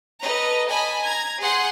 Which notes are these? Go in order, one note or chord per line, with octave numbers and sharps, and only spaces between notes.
A4 B4 D#5 A#5
D#5 G#5 A5 B5
A#5 G#6
G#4 F#5 C6 G6